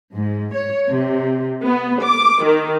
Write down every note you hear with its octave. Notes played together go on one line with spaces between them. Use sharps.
G#2
C#5
C3
B3
D6
D#3